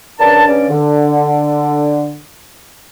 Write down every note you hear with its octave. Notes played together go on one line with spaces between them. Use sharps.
G2 C#3 D4 A#4 A5
G2 C#3 C#4 D5
D3